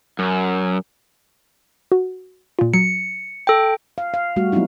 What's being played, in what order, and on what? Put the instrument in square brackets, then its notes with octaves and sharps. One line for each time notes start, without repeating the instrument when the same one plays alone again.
[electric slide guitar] F#2
[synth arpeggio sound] F#4
A#2 F4
[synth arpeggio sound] F#3 [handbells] C#7
[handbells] A4 G5
[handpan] F5
F5
G3 A3 F#4
F#3 B3 C4 D#4 E4